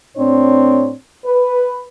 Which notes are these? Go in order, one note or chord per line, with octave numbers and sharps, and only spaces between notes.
A2 C4 D4 C#5
B4